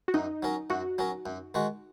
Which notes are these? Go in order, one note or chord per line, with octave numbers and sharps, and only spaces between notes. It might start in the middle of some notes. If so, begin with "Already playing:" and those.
F#4
F#2 D#4
F#3 C#4 A#4
F#2 F#4
F#3 C#4 A#4
F#2
D#3 G#3 F#4